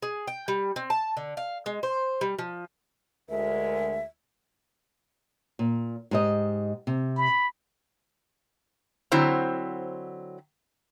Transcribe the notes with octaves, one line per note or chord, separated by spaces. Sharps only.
G#4
G5
G3
C4
A5
D3
F5
G#3
C5
G3
F3
D2 G#3 A#4 E5
A#2
G#2 G4 D#5
C3
B5
D3 F#3 C4 E4 C5 A#5